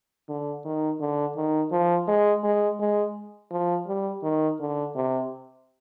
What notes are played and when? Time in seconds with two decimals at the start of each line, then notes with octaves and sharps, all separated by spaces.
0.29 D3
0.65 D#3
1.00 D3
1.36 D#3
1.72 F3
2.08 G#3
2.44 G#3
2.80 G#3
3.51 F3
3.87 G3
4.23 D#3
4.60 D3
4.96 C3